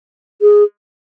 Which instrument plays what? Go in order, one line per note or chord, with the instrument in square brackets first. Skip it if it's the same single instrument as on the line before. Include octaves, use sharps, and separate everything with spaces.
[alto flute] G#4